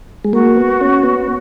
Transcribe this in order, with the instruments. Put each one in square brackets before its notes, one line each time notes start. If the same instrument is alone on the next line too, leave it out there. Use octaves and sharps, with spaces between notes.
[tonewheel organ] G#3
[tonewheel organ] A#3 [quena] F#4
[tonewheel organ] B3
C#4
B3